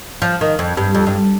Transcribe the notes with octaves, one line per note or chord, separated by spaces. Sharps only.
F3
D#3
F2
G2
F2
G2